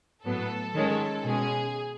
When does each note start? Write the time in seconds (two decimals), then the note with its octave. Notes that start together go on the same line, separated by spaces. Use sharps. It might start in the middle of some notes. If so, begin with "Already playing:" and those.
0.24 A2 F#3 B3 A4
0.75 D#3 G#3 C#4
1.25 B2 G#3 C#4 G#4